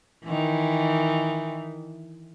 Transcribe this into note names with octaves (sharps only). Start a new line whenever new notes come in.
D#3 E3